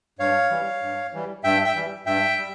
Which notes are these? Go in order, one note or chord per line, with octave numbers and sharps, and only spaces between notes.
G2 C#5 F5
E3 G3
G2
E3 G3
G2 E5 G5
E5 G5
E3 G3
G2 E5 G5
G3